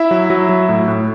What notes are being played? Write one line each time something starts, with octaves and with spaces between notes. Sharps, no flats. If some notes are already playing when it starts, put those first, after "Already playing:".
Already playing: E4 E5
F#3
F#3
F#3
A2
A2